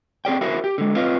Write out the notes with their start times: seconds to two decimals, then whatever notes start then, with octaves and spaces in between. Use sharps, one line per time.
0.25 C4 G#4 D5 G5
0.41 E4 F#4 G#4 A#4 C5
0.64 G4
0.78 D3 G#3
0.96 C4 F4 B4 D#5 F5